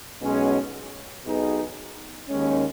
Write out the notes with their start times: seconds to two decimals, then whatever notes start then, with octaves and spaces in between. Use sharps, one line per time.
0.22 B1 B2 G#3 C#4
1.26 B1 B2 B3 D#4 G#4
2.29 D#2 D#3 G#3 C#4